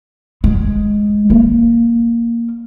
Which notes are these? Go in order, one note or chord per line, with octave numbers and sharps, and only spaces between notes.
G#3
A#3